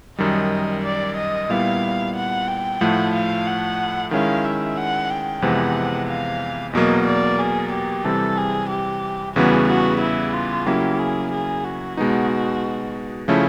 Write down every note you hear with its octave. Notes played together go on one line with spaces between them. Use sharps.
F#2 D#3 G3 D#5
D5
D#5
A#2 G3 B3 E4 F5
F#5
G5
A2 F3 A3 F#5
F5
F#5
D#3 G#3 C#4 E4 F5
E5
F#5
G5
F2 C3 E3 G#3 B3 F#5
F5
E2 B2 F#3 A#3 D#5
D5
G#4
G4
C3 E3 G3 C4 A4
G#4
G4
E2 C#3 E3 G3 B3 F#4
F#4
E4
F4
C#3 F#3 A#3 C#4 E4 G4
G#4
G#4
F#4
B2 G#3 B3 D#4
C#3 F3 A3 C#4 E4